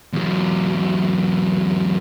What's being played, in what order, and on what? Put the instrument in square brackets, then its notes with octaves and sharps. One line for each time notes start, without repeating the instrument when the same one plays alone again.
[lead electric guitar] E2 F#3